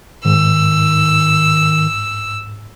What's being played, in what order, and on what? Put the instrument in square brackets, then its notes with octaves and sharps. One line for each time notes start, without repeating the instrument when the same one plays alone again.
[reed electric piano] G#2 [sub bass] D#3 [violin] E6